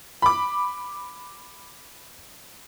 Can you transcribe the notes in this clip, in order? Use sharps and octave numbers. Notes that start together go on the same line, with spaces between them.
B5 D6